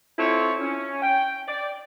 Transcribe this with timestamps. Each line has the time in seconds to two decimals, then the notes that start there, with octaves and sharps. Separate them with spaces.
0.19 C4 E4 F4 A4 C#5
0.61 C#4
1.03 G5
1.48 D5